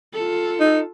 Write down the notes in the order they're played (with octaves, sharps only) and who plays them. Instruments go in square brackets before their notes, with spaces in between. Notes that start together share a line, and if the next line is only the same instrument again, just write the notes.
[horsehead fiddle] F4 A4
[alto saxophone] D#4